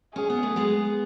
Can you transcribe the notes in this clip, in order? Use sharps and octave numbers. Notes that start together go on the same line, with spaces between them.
C#4 G#4
B3
A3
G#3 B3